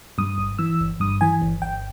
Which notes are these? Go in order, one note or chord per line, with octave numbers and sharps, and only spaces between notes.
G2 D#6
G1
E3 E6
G1
G2 D#6
E3 G#5
G1
G1 G5